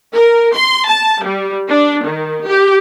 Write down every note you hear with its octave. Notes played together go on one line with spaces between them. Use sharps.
A#4
C6
A5
G3
D4
D#3
G4